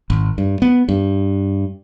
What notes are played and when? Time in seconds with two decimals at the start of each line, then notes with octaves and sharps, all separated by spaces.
0.10 G#1
0.38 G2
0.62 B3
0.89 G2